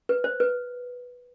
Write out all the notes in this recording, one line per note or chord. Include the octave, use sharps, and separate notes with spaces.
B4
C5
B4